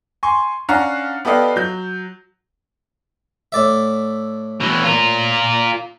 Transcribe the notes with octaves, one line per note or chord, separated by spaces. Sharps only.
G#5 C6 C#6
C#4 D4 F5 F#5 A#5
B3 G4 A4 D5 D#5 F5
F#3 G6
A2 D5 E5
B2 E3
F4 A#4